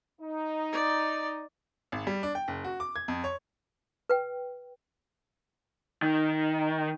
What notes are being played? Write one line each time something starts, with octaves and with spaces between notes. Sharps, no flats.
D#4
D5
G#1
G3
D4
G5
F#1
F#4
D6
G#6
F2
C#5
B4 G5
D#3